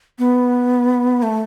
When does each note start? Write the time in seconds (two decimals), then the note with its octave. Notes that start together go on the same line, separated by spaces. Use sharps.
0.19 B3
1.23 A3